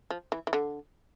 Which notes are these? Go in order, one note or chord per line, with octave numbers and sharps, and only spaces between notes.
F3
E3
E3
D3